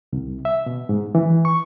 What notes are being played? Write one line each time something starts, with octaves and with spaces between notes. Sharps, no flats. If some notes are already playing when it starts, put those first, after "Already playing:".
C2
E5
B2
G#2
E3
C#6